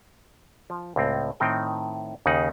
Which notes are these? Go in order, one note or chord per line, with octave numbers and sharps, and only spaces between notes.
F3
C#2 A2 C4
A2 D#3 C4 D#4 G5
D#2 C#3 D#4 F#5